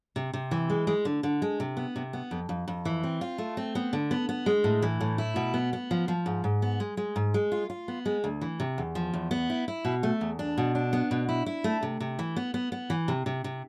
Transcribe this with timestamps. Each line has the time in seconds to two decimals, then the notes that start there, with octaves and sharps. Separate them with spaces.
0.16 C3
0.33 C3
0.51 E3
0.70 G#3
0.87 G#3
1.05 D3
1.23 D3
1.42 G#3
1.60 C3
1.77 B3
1.96 C3
2.13 B3
2.31 F2
2.49 F2
2.68 F2
2.85 E3
3.03 C4
3.21 F4
3.38 A3
3.57 C4
3.75 B3
3.93 D3
4.11 B3
4.29 B3
4.46 G#3
4.64 A2
4.82 E3
5.01 A2
5.18 E4
5.36 B2
5.54 B3
5.73 B3
5.91 F3
6.08 F3
6.26 G#2
6.44 G#2
6.62 B3
6.80 G#3
6.97 G#3
7.16 G#2
7.34 G#3
7.52 F4
7.70 F4
7.88 B3
8.06 G#3
8.24 D2
8.41 E3
8.60 C3
8.78 E2
8.95 F3
9.14 E2
9.31 B3
9.50 E4
9.68 E4
9.85 B2
10.03 A3
10.21 E2
10.39 D4
10.58 B2
10.75 D4
10.93 B3
11.11 B2
11.29 E4
11.46 E4
11.64 A3
11.83 C3
12.00 C3
12.19 E3
12.36 B3
12.54 B3
12.72 B3
12.90 E3
13.08 C3
13.26 C3
13.44 C3